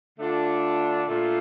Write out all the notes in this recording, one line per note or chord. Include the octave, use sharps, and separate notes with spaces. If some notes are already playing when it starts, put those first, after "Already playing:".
D3 A3 D4 F4
A#2 A3 D4 F4